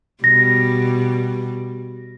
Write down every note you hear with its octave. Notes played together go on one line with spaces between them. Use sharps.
B2 G3 A#6